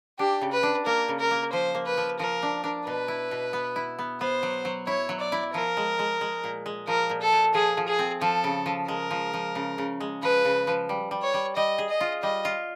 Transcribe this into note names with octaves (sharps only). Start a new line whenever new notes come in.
D4 G4
C#3
B4
D4
A#3 A#4
C#3
A#4
A#3
F3 C5
A#3
B4
F3
F3 A#4
D4
D4
B2 B4
E4
B2
B3
E4
B3
B3 C5
F#3
F#3
E4 C#5
F#3
D5
E4
F3 A#4
G#3
G#3
G#3
A#2
G#3
F3 A#4
A#2
A4
A#2
F3 G#4
F3
G#4
C4
F3 A4
C#3
F3
G#3 A#4
F3
F3
C#3
C#3
G#3
F3 B4
C#3
F3
G3
G3
C#5
G3
G3 D#5
G#4
D#5
F4
G3 D#5
F4